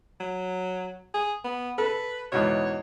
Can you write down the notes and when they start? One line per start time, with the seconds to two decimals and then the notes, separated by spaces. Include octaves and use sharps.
0.20 F#3
1.14 G#4
1.44 B3
1.78 A4 B4
2.32 E2 G#2 B2 C#5